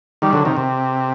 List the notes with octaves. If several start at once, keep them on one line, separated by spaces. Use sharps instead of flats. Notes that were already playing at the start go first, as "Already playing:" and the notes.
D#3 G3
D3 F#3
C3 D#3
C3